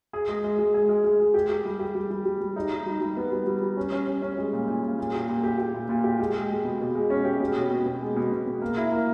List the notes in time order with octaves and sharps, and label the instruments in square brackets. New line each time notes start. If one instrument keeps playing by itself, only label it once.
[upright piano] G#4
G#3
G#3
G#3
G#4
G#3
G#3
G#3
G4
G4
G3
G4
G3
G3
G3
G3
D#4
D#4
G3
G3
B3
G3
G3
G3
C#4
C#4
C#4
C#4
G#3
A#2
A#2
A#2
A#2
G4
A#2
G4
G4
A#2
A#2
G4
G#3
G#3
G#3
B2
B2
G#3
C#4
G4
B2
B2
B2
B2
G#3
B2
B2
B2
A#3
E4
A#3